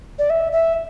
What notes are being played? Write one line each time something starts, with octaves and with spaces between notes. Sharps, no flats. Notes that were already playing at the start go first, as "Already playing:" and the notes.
D5
E5
E5